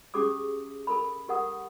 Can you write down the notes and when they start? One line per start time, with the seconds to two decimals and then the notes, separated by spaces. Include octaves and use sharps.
0.14 C#4 G4 G#4 D6 D#6
0.87 A4 A#4 B5
1.28 G4 A#4 F#5 D#6